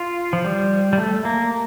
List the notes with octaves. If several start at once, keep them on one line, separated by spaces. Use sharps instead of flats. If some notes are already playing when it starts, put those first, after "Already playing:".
Already playing: F4
F3
G3
G3
A3
A#3